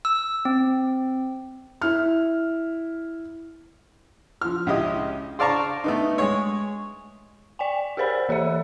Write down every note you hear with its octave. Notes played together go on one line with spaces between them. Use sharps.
E6
C4
E4 F6
F3 F6
C#2 C#3 E4 G4 D#5 D#6
C5 D5 F5 A5 A#5 C#6
A3 B3 D#4
G#3 G#4 C#5
D5 G5 G#5
G4 G#4 A#4 C5 D5 B5
E3 G4 A4 E5